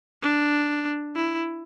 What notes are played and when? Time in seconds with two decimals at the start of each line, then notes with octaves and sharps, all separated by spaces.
0.23 D4
1.16 E4